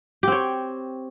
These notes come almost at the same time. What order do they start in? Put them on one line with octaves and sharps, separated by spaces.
G4 C4 C#5